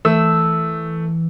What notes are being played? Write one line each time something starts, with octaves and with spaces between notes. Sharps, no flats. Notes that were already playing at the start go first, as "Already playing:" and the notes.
E3 A3 E6